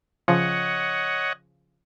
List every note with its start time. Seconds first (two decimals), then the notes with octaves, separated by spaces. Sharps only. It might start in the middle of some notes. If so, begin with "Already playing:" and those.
0.28 C#3 F3 C#5 D#5 F#5